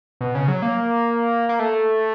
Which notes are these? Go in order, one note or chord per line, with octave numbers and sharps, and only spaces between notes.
B2
C#3
F#3
A#3
A#3
A3